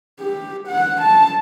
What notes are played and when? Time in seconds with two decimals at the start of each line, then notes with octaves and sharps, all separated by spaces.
0.20 G4
0.68 F#5
1.02 A5